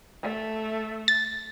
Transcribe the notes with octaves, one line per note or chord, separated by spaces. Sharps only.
A3
A6